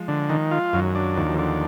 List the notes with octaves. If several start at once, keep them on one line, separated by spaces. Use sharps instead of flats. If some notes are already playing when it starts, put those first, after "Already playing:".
Already playing: F3 G#3
D3
D#3
F4
F#2 D#3 F#3
D4
D#2 F3
F#3
D3 F3 D4